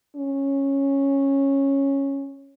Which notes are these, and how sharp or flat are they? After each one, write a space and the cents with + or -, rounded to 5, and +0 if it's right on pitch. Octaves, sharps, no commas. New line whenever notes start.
C#4 -10